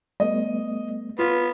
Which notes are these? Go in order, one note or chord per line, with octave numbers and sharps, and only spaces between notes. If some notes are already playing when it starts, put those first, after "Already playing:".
G3 A3 B3 D#5
B3 F4